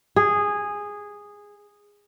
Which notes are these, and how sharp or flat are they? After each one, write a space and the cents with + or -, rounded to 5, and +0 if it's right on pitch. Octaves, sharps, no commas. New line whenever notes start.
G#4 -10